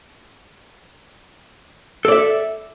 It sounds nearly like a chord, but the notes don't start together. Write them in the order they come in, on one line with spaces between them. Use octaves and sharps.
A4 D5 E5